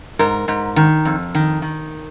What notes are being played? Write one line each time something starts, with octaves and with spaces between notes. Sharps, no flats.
G#2 A#4
G#2
D#3
F2
D#3
D#3